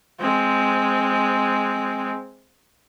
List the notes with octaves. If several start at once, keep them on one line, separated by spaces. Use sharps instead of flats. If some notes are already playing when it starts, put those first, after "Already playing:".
G#3 C4